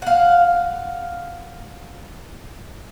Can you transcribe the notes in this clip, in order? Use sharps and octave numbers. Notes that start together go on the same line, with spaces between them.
F5 F#5